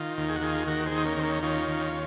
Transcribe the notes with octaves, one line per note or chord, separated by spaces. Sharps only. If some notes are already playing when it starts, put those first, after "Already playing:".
Already playing: D#3 F4
D#2
G#4
F#4
D#3 F4 G#4
D#2 F#4 A#4
G#4 C5
D#3
D#4
A#3 C#4
D#2 C4
A#3 C#4
D#3 C#4 F4
D#2